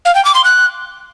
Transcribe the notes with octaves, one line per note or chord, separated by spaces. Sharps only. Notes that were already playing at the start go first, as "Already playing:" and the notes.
F5
G5
D6
C6
F#6